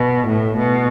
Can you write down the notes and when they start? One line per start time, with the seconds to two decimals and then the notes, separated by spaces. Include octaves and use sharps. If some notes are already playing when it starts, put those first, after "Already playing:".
Already playing: B2
0.28 A2
0.57 B2